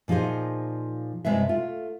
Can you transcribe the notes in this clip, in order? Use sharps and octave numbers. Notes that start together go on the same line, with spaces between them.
A#2 F3 D#4 G#4 C5
G2 C3 G#3 B4 E5
A3 F4